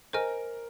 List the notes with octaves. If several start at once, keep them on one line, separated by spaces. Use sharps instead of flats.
A#4 C5 D#5 G#5 F6